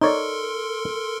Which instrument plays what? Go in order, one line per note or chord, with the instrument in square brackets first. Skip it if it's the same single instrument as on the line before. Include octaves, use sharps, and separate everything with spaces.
[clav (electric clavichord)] D#4 C#5 D5 [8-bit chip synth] A4 A#4 C6